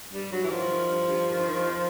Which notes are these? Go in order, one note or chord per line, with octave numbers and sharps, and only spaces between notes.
G2 G3
G2 F#3
E3
D#3 F3
D#3
G2
G2
D#3
D#3
F2